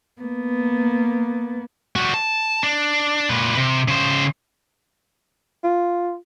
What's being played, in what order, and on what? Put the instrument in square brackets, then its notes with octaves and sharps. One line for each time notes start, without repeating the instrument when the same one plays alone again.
[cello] A#3 B3
[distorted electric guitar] G3 F#4
A5
D4
A#2 B4
C3
C#3 C5
[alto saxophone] F4